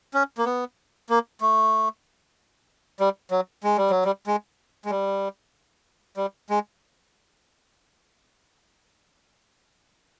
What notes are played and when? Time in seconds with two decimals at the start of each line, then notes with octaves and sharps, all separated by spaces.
0.14 C#4
0.38 A#3
0.45 B3
1.09 A#3
1.41 A3
3.00 G3
3.31 F#3
3.63 G#3
3.77 G3
3.90 F#3
4.05 G3
4.27 G#3
4.85 G#3
4.90 G3
6.17 G3
6.50 G#3